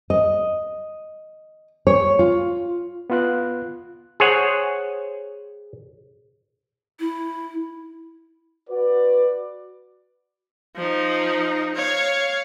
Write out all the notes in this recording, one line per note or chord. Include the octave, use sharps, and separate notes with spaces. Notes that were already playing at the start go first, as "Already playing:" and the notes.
D#5
C#5
F4
B3 F4 F#6
G#4 C5 C#5 F#5
E4
F#4 B4 D5
F3 D#4
C#5 F5